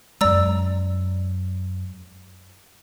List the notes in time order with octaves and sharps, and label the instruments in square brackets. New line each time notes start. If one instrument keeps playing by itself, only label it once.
[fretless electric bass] F#2 G#3 [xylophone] D5 A#5 E6